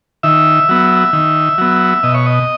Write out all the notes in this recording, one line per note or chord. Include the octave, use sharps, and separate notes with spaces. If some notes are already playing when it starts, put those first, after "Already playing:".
D#3 E5
F#3 B3
D#3
F#3 B3
B2 D#5
C#5
D#5